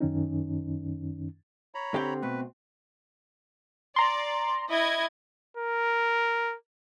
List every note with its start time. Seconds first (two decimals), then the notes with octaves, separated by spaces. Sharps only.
0.01 F#2 D#3 C#4 D#4
1.75 C#5 A#5 B5
1.94 D3 C4 G4 G5
2.22 B2 A3 B4
3.96 D5 A#5 C6
4.68 E4 D#5 G#6
5.57 A#4